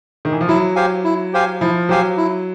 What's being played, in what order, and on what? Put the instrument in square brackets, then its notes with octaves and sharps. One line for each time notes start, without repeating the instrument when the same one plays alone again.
[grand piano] D#3
E3
F3
[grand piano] F#3 [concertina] E4
[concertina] G4 C5 F5 G#5
E4
G4 C5 F5 G#5
[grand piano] F3 [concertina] E4
[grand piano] F#3 [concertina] G4 C5 F5 G#5
[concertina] E4